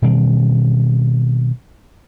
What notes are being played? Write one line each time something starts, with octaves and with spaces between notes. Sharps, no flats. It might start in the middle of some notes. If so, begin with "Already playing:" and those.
B2 D#3 G3 C4